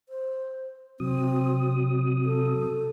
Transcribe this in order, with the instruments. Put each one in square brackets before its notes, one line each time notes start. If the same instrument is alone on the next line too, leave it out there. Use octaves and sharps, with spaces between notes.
[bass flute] C5
[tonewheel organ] C3 F#3 D#6 [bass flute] C4
[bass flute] A4